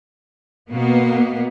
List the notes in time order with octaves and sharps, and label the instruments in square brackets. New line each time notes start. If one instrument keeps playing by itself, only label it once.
[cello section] B2 A#3 B3